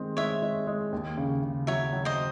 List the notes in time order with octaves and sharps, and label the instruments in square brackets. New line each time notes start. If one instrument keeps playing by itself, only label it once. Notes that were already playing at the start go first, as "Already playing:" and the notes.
Already playing: [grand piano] D#3 G#3 C4
[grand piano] G#3 [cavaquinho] C#5 E5
[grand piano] G#3
G#3
D#2
C#3
C#3
[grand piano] F#3 [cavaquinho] C#5 E5
[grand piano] F#3
[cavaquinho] C5 D#5